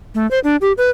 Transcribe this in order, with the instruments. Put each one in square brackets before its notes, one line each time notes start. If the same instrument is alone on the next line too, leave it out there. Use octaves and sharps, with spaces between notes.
[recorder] A3
C5
D4
G4
B4